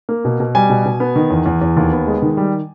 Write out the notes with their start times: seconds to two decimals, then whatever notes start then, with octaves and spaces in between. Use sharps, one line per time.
0.09 A#3
0.25 B2
0.40 B2
0.55 G3 G#5
0.70 B2
0.85 B2
1.00 B3
1.16 D#3
1.31 E2
1.46 E2
1.62 E2
1.77 D#2
1.92 B3
2.07 G#3
2.22 D#3
2.37 G3